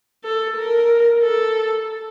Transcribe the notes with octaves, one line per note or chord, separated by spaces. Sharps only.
A4
A#4
A4